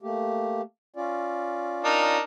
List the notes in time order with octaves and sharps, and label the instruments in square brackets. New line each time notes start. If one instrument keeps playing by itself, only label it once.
[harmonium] A3 A#3 G4
C#4 F4 D5
[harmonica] D4 D#4 A#4